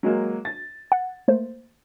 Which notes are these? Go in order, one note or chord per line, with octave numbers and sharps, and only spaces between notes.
F#3 G#3 A#3
A6
F#5
A3 A#3 C5